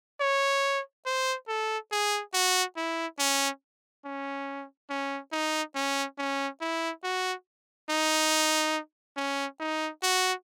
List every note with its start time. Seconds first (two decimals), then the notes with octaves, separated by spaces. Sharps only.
0.21 C#5
1.06 C5
1.48 A4
1.92 G#4
2.34 F#4
2.77 E4
3.19 C#4
4.05 C#4
4.90 C#4
5.32 D#4
5.75 C#4
6.18 C#4
6.61 E4
7.04 F#4
7.89 D#4
9.17 C#4
9.60 D#4
10.03 F#4